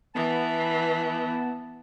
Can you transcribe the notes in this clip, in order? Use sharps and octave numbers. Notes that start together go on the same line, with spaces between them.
E3 B3 A5